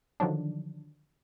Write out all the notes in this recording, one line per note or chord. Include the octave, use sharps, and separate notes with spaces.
D3 D#3 F3 F#3 D4